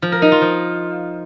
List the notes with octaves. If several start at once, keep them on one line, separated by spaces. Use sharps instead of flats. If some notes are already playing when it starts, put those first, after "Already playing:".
F3
A#4
D#4
F4
F3